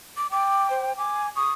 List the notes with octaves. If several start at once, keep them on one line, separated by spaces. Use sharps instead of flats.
D6
G5 D6
C5
G#5 D6
C#6 D#6